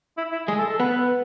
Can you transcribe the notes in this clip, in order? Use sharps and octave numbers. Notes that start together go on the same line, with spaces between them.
E4
E4
G#3 G#4
A4
A4
B3 B4